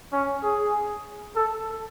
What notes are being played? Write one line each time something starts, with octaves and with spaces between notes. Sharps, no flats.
C#4
G#4
A4